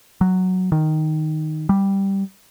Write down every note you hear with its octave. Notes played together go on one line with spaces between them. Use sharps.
F#3
D#3
G3